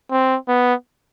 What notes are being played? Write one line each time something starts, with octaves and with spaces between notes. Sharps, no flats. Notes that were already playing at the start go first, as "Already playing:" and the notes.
C4
B3